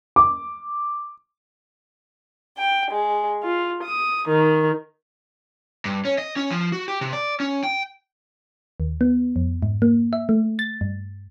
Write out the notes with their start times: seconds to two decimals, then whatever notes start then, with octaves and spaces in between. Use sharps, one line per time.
0.16 D6
2.57 G5
2.90 G#3
3.43 F4
3.82 D#6
4.28 D#3
5.85 G2
6.05 C#4
6.18 D#5
6.36 C#4
6.51 F3
6.72 F#4
6.88 G4
7.01 C3
7.13 D5
7.40 C#4
7.64 G5
8.80 D#2
9.01 B3
9.36 F2
9.63 G#2
9.82 A#3
10.13 E5
10.29 A3
10.59 A6
10.81 G2